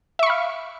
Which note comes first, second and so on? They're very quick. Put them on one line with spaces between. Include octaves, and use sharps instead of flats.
E5 C#6 B5 F5